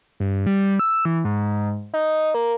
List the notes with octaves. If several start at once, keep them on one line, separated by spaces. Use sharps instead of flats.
G2
G3
E6
E3
G#2
D#4
A#3